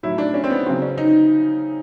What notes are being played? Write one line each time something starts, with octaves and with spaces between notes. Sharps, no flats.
A2 F#3 E4
D4
C#4
C4
B3
C#3 F#3 C4
C#4
D#4